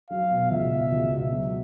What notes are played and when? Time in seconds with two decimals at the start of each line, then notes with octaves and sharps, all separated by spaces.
0.10 F#3 F5
0.31 B2
0.51 C#2 E5
0.71 B2
0.91 C#2
1.12 B2
1.32 F#3